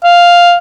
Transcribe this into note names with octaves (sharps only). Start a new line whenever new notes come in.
F5